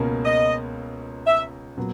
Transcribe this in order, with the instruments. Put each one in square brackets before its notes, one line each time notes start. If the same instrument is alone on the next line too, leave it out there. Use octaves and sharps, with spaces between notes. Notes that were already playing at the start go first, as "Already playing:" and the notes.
Already playing: [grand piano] C#2 B2 A#3 C#4
[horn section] D#5
E5
[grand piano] A#2 F#3 B3